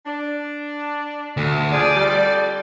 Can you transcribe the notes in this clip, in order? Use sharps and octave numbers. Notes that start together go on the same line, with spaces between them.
D4
D2
F3 D4 G#4 D5
F2 G3